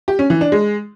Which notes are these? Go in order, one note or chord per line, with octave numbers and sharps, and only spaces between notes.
G4
C#4
E3
D4
G#3